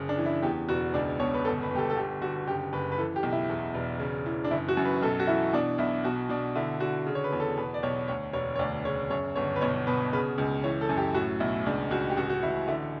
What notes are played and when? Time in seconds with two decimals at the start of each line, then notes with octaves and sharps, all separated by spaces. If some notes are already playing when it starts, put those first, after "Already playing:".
Already playing: F#1 C#3
0.09 D4
0.18 E3
0.26 E4
0.42 E2 G4
0.69 E1 F#4
0.94 C#2 D4
1.20 B2 C#5
1.34 B4
1.45 G1 A4
1.63 B4
1.70 G1
1.75 G4
1.79 A4
1.90 A4
1.97 D3 G4
2.21 D3 F#4
2.47 F#1 G4
2.73 F#1 B4
2.92 B4
2.98 E3 A4
3.16 G4
3.23 B1
3.32 E4
3.49 E2
3.75 E1
4.00 C#3
4.26 E3
4.44 D4
4.51 F#1 E4
4.69 F#4
4.77 F#2
4.85 B4
5.02 B1 A4
5.20 F#4
5.27 E3 E4
5.53 B2 D4
5.78 B1 E4
6.04 B2 F#4
6.29 B2 D4
6.56 D3 E4
6.80 D3 F#4
7.06 C#3
7.15 C#5
7.24 B4
7.32 E2
7.40 A4
7.58 B2 B4
7.74 D5
7.83 B1 C#5
8.08 D2 C#5
8.33 E1 C#5
8.56 C#5
8.59 D2 D5
8.85 C#3 C#5
9.10 F#2 C#5
9.36 G1 C#5
9.56 B4
9.61 B1 C#5
9.87 B2 B4
10.13 C#3 B4
10.38 C#2
10.64 E3 C#5
10.81 A4
10.89 F#2
10.97 G4
11.15 A2 F#4
11.40 B1 E4
11.66 C#2 D4
11.91 C#2 F#4
12.09 G4
12.17 A1 F#4
12.30 F#4
12.43 A1 E4
12.68 D3 E4